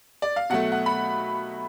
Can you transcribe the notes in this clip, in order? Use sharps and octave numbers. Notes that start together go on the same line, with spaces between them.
D5
F5
B2 F#3 A3 F#5
F#5
B5